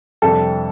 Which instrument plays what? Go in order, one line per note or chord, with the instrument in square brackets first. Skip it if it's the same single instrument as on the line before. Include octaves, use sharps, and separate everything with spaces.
[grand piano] F2 C3 G3 D4 [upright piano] A4